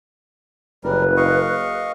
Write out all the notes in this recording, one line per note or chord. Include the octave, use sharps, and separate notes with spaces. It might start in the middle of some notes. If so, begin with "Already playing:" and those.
F#1 G3 A#4 B4
D#5 F5 C#6